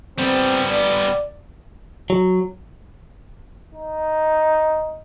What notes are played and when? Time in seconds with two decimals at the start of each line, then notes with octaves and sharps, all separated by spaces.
0.18 G3 B3 C4
0.70 D5
2.10 F#3
3.75 D#4